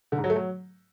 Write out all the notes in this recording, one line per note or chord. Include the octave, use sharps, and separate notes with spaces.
D3
G#2
F#3
A3
F#3